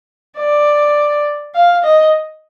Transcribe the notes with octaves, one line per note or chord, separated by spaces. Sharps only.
D5
F5
D#5